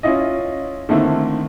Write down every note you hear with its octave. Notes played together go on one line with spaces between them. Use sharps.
C#4 E4 F4 D#5
D3 D#3 A3 A#3 C4 E4